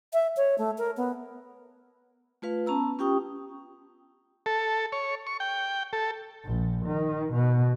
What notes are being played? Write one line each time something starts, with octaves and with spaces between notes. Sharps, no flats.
E5
C#5
A3
A#4
B3
A3 F4 B4 F5
B3 C#4 A5 A#5 E6
C#4 F4 G4 G5 C#6 D#6
A4
C#5
C#6
G5
A4
A#1
D#3
B2